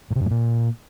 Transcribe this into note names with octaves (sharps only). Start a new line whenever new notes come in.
A2
C3
F#2
A2
A#2